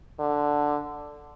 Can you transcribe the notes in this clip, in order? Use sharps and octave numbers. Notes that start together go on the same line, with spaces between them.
D3